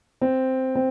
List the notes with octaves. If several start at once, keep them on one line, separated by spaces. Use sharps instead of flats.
C4
C4